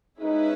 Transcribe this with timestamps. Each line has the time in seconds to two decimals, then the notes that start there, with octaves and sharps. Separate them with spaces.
0.21 G#3 C#4 D#4 E4 G#4 B4